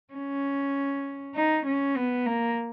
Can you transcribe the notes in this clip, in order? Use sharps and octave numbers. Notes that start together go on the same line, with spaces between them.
C#4
D#4
C#4
B3
A#3